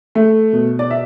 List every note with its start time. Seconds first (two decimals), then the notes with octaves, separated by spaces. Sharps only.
0.15 A3
0.53 B2
0.79 D5
0.91 E5